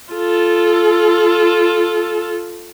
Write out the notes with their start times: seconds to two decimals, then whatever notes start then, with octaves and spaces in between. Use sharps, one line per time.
0.13 F4 A4